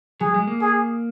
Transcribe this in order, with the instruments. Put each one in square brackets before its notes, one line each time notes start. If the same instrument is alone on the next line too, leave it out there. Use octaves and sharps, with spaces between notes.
[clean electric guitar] F#3 [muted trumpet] G#4
[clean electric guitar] G#3
A#3
[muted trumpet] G#4